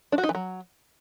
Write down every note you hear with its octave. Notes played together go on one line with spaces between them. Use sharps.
D4
F#4
D#4
E3
F#3